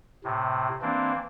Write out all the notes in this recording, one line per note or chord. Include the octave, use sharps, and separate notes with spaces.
A2 C3
E3 A#3 C4 D4